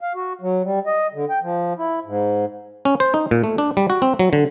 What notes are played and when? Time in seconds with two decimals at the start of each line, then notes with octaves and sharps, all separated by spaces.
0.01 F5
0.15 F#4
0.41 F#3
0.64 G3
0.87 D#5
1.14 D3
1.29 G5
1.42 F3
1.78 E4
2.05 G#2
2.85 C#4
3.00 C5
3.14 D#4
3.31 A#2
3.44 A3
3.58 D4
3.77 G3
3.90 F#4
4.02 C4
4.19 F#3
4.33 D3